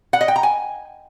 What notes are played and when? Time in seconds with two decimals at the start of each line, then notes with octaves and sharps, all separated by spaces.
0.13 F#5
0.21 D#5
0.28 G5
0.36 A#5
0.43 G#5